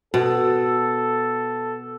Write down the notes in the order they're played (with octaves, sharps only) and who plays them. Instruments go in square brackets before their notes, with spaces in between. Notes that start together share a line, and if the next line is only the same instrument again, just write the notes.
[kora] B2 [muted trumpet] A4